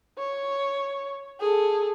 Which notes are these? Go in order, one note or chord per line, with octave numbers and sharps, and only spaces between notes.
C#5
G#4 A4